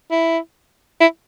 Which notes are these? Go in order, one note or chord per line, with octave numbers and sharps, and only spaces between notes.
E4
E4